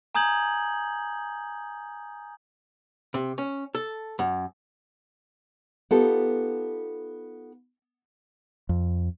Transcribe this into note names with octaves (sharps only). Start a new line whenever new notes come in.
G#5 A#5 D#6 G6 G#6 F#7
C3
C#4
A4
F#2
B3 D#4 F4 G4 A4
F2